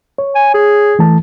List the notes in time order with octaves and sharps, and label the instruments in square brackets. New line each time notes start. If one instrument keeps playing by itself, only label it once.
[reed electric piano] C#5
[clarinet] G#5
G#4
[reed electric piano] E3 A3 A5